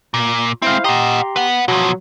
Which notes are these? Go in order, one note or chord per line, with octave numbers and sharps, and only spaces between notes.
A#2
G#3 C4 E4 C5 F5
G4 D#5 F#5 A#5 C6
B4 F#5
B2 F3 F#3